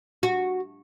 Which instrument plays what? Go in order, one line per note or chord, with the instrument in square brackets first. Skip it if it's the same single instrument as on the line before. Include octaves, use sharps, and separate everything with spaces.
[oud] F#4